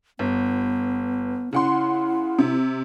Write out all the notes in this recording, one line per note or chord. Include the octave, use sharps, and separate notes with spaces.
G1 B3
C#3 E4 F#5 C6
C3